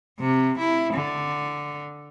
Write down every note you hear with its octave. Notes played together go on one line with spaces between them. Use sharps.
C3
E4
D3